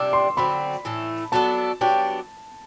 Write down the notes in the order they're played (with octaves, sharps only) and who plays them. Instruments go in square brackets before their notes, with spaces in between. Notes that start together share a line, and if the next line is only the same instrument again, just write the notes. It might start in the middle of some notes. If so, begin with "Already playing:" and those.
Already playing: [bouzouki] C3 G3 D4 [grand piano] D6 E6
[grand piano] C6
[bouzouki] D3 F#3 C4 [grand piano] B5
[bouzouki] A2 E3 A3
[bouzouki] F#3 B3 D4 A4 [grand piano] A5
[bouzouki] F#3 B3 D4 G4